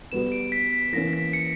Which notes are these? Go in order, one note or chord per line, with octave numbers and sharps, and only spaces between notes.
G3 B3 F#4 B4 E7
D7
B6
B6
E3 A#3 C#4 A#6
B6
C#7